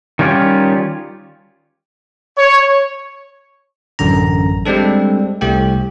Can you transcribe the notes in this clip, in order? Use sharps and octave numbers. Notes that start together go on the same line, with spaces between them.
D#3 G3 C#4 F4 G4
C#5
A1 F#2 D3 A#5
G3 G#3 C4 D4 A4
C2 A3 G4 G5